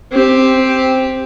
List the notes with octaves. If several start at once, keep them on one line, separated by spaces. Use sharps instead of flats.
C4 G4